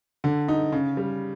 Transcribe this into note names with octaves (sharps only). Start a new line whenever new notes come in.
D3
D#4
C#3
G3